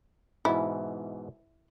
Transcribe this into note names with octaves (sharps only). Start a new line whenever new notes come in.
G#2 B2 E3 E4